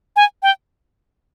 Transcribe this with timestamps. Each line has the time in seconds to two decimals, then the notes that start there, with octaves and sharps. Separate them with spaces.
0.16 G#5
0.43 G5